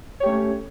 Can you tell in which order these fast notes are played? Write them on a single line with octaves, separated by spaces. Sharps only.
C#5 G4 A3 C#4